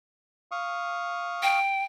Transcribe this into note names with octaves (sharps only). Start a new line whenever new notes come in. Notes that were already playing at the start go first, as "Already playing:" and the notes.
F5 C#6 D#6
G5